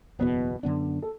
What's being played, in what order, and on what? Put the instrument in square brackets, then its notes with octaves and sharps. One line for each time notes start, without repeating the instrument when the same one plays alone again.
[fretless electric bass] F#1 E2 B2 [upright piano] B3
[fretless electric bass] F#2 D3 B3 D4
[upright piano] A4